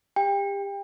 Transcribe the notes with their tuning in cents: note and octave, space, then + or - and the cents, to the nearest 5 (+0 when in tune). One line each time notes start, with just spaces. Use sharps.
G4 +30 G5 +30